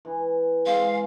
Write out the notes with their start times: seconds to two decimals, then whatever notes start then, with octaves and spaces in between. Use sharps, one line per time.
0.05 E3
0.66 G#3 C4 G#4 F5